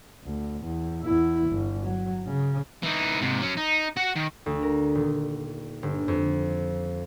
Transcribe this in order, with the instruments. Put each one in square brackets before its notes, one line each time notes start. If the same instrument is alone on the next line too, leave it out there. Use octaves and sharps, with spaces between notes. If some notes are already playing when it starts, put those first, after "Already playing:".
[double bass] D2
E2
E2 E4
G1
F#3
C#3
[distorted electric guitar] E3 D#4
G#2 C3
F#3 C#4
D#4
F#4 F#5
D#3
[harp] D2
A#4
D#1
G1
F2